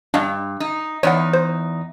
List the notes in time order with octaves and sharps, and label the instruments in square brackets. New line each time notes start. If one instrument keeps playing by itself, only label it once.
[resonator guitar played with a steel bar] G2 [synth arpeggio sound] D4 D#5 F5
[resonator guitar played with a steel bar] D#4
[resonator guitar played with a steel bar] E2 D#4 [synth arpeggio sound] C#5 D5 F#5
[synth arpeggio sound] C5